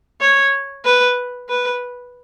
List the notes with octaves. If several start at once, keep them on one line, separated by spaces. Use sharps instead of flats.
C#5
B4
B4